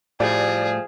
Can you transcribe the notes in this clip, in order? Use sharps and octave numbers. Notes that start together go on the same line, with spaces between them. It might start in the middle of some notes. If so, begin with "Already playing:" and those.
A2 F3 G3 A3 G#4 D5